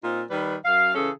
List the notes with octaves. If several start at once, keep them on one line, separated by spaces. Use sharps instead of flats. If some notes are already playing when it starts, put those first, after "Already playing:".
A#2 C4 D#4 F4
D#3 G3 B4
F#2 F5
C#3 E3 C#4 G#4 A4